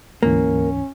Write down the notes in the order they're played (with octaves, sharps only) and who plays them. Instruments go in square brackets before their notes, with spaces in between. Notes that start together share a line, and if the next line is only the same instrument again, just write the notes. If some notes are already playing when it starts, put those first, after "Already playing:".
[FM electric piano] D2 G#2 E3 [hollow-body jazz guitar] A#3 [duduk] C#4